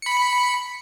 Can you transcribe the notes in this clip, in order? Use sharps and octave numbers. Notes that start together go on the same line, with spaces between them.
B5 C#7